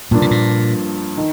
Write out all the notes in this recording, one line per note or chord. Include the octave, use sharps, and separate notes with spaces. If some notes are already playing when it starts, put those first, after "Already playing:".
G2 A#2 F3 A#3 D4
C3
A#2
D#3